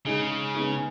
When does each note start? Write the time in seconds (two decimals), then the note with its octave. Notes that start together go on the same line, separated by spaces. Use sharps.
0.05 C#3 G#3 D#4 G#4
0.55 G#3 B3 D#4 G#4